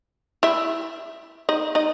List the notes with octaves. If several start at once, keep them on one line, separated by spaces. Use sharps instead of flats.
E4 E5
D#4 D#5
D#4 D#5